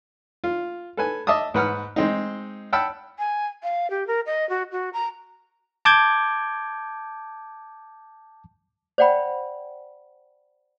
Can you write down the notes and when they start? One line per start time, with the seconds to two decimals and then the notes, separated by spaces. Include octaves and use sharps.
0.44 F4
0.97 A4 B4 G#5
1.27 D#5 E5 A5 D6 D#6
1.54 G#2 B4 F#5 F6
1.96 G#3 C4 D#4
2.73 F#5 G5 A5 B5 E6
3.19 G#5
3.63 F5
3.90 G4
4.07 A#4
4.26 D#5
4.49 F#4
4.72 F#4
4.93 A#5
5.85 A5 D6 G6 G#6
8.98 C5 D5 F#5 G5 B5